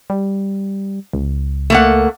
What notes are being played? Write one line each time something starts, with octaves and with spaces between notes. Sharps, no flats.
G3
C#2
A3 A#3 F#5